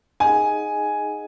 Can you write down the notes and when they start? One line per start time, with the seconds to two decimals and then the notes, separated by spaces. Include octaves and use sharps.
0.20 D#4 G#4 D#5 F#5 G#5